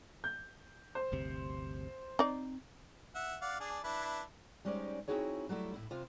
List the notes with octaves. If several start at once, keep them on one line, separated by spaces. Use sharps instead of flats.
G6
C5
G1 D2 C3
C4 D#4 D5
E5 F#5
D5 F5 F#5
D4 G#4 D5
D4 E4 B4
G3 G#3 C#4 D#4 C5 D5
C4 D#4 E4 F#4 G#4 C#5
F#3 G3 A3 E4
A2 E4
C3 F4 C5